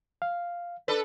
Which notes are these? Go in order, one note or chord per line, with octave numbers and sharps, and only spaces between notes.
F5
D4 A4 B4